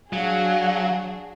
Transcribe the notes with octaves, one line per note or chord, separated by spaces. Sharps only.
F#3 D4 F#4 G#4 F5